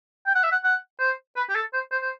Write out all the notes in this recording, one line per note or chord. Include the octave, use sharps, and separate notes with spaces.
G5
F#5
E5
F#5
F#5
C5
B4
G4
A4
C5
C5
C5